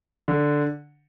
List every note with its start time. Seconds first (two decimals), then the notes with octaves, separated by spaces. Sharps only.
0.28 D3